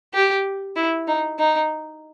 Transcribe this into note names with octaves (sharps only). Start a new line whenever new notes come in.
G4
E4
D#4
D#4